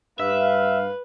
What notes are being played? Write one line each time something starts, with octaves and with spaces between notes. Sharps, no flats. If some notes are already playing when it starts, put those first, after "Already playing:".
G2 B4 E5 F5